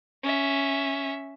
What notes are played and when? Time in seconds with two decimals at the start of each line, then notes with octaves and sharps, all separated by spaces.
0.23 C#4 E5